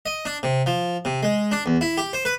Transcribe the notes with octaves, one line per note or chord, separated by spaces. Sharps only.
D#5
D4
C3
F3
C3
G#3
D4
E2
E4
G4
C5
B4